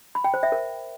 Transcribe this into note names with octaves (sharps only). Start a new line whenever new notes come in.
B5
G5
C5
E5
A#4